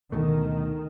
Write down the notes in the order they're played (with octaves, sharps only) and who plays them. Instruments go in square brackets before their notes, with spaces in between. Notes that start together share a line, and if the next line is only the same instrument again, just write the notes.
[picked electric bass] D2 B2 A3 [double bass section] D#3